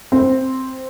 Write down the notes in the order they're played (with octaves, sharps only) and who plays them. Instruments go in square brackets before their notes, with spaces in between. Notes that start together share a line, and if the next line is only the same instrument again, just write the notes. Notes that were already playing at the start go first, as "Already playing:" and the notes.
[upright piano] C4